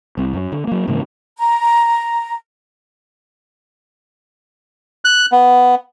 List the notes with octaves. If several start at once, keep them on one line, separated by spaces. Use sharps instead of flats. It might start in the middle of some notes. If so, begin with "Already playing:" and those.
C2 C3
F#2
D3
F#3 A#3
G#2 C#3 E3 A#3
A#5
F#6
B3